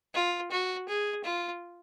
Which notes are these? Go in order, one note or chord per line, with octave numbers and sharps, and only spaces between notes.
F4
F#4
G#4
F4